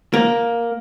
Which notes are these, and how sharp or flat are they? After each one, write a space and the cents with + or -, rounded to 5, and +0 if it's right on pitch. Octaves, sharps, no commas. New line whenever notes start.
A#3 +5